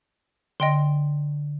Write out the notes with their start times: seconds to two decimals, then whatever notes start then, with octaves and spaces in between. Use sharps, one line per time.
0.60 D3 D#5 G5 C6